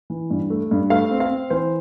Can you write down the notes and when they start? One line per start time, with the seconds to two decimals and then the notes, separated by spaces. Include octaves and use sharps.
0.10 E3
0.30 G2
0.50 A3
0.71 G2
0.90 A3 F5
1.11 C4
1.20 F5
1.30 C4
1.50 E3 C5